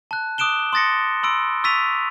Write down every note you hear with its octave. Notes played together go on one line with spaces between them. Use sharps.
A5 F#6
D6 D#6 F#6 D7 E7 G7
C6 D#6 A6 A#6 C#7
B5 C6 E6 D7
C#6 E6 A6 B6 D#7 F7